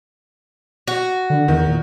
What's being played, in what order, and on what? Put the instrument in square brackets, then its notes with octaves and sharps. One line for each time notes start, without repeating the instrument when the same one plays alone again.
[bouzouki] F#4
[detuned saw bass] D3
[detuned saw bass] E2 [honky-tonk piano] D#3
[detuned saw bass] A#2